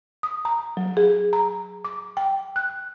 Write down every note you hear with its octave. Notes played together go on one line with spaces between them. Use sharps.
D#6
A#5
F#3
G#4
A#5
D6
G5
F#6